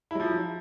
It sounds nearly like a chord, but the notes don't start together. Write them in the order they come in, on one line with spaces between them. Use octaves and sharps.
E4 F#3 F3